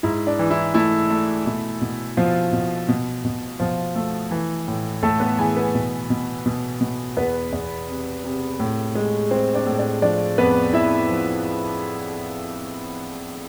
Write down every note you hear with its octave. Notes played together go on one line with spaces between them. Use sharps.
G#2 E4
D4
E3
E4
A3 E4
A3
B2 E4
B2
B2 F3 F4
B2
B2
B2
B2 F3 F4
A3
E3
A2
A2 A3 A4
B3 B4
E3 G#4 G#5
B3 B4
B2
B2
B2
B2
E2 B3 B4
E2
C3
C3
A2
G#3
G#3 C4 C5
D4 D5
A2
D4 D5
F3 D4 D5
F2 B3 B4
F2 E4 E5
F3